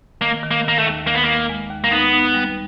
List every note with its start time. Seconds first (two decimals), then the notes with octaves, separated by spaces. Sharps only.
0.21 D#3 A#3
0.43 D#3
0.51 A#3
0.64 D#3 A#3
0.78 A3
0.86 D#2
1.07 D#3 A#3
1.15 B3
1.24 D#2 A#3
1.49 G#3
1.70 D#2
1.84 A#3
1.91 B3 D#4
2.13 D#4
2.34 G3